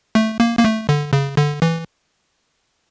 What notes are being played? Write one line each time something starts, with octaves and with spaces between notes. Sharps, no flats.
A3
A#3
A#3
A3
D3
C#3
D3
E3